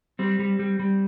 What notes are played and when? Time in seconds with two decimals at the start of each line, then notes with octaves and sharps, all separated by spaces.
0.19 G3 C4
0.39 G3
0.59 G3
0.79 G3